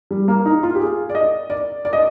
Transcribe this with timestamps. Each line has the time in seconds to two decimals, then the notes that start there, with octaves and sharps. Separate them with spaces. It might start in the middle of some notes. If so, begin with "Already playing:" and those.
0.11 G3
0.28 A#3
0.46 D#4
0.63 F4
0.75 G4
0.80 G#4
1.10 D5
1.15 D#5
1.50 D5
1.85 D5
1.93 D#5